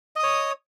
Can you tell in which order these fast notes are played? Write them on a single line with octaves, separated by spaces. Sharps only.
D#5 D#6 C#5